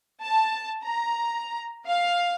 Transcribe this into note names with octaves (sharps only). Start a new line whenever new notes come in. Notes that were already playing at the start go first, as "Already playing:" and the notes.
A5
A#5
F5